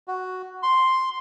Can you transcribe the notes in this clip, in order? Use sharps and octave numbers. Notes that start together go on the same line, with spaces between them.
F#4
C6